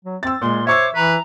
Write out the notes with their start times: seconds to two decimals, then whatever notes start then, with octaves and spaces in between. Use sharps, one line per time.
0.05 F#3
0.23 C4 E6 A6
0.42 A#2 G#3 C6
0.67 C5 C#5 E5 C#6 D6 E6
0.95 E3 B4 A#5